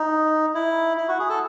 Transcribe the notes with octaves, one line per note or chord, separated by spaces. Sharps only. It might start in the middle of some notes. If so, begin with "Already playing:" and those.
Already playing: D#4
E4
E4
F#4
G#4
A4